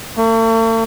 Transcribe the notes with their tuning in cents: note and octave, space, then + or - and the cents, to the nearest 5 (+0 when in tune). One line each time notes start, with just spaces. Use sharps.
A3 +45